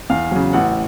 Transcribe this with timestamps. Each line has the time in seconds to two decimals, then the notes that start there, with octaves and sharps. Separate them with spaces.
0.10 E2 F5
0.31 C#3 F#3
0.53 A1 F#5